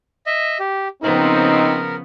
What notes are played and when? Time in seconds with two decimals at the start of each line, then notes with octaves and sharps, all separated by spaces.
0.26 D#5 E5
0.60 G4
1.03 C#3 F3 B3 C4 D#4 A#4